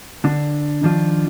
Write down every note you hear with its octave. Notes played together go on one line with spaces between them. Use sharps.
D3 D4
D#3 F3 D4 F4